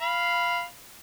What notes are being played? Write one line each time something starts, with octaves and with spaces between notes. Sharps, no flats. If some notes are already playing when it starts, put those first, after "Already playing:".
F5 B5